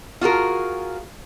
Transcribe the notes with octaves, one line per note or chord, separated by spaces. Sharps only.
F4 F#4 G#4 A#4